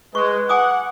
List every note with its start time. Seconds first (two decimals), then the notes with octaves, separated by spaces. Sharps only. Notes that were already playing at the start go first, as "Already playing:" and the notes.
0.15 G#3 B4 C#6
0.49 F#5 G#5 D6 D#6